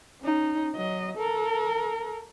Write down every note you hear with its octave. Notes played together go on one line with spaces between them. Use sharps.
C#4 D#4
F#3 D#5
A4 A#4